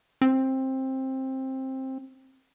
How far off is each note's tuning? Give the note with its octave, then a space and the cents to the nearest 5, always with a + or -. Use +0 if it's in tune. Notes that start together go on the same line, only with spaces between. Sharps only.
C4 +15